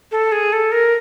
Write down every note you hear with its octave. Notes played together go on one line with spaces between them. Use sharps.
A4
G#4
A4
A#4